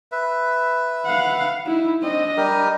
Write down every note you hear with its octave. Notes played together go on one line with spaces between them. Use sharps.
B4 E5
F5 F#5
D#4 E4
C4 D4 D#5
G3 G4 A#4